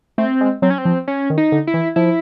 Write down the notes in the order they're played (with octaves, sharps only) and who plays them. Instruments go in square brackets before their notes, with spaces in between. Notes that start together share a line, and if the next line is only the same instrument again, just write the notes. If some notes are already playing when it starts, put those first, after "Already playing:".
[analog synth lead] A3 [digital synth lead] C4
[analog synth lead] G#3
[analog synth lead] F#3 [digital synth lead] C4
[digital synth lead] C#4
C4
[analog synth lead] F3
[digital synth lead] C#4
[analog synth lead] D#3
[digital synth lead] D#4
[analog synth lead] D3
[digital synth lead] E4
[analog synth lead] E3
[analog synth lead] F3 [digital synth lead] E4